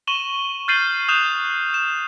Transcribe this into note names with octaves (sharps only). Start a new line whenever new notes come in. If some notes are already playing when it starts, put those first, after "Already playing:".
C#6 D#7 E7 F#7 G7
F6 G6 A6 C7 D#7 F#7
D#6 F#6 G6 E7 F7
E7